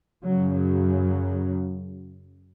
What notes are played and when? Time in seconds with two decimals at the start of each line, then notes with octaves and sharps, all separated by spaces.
0.22 F#2 C#3 F#3
0.54 F#3